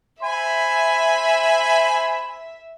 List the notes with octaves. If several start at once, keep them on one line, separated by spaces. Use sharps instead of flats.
C5 E5 G#5 B5